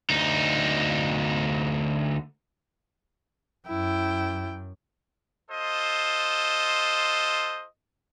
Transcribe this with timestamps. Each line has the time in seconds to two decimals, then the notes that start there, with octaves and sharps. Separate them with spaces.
0.10 D2 D#4
3.67 F#2 E4 G5
5.51 F4 A4 C5 D#5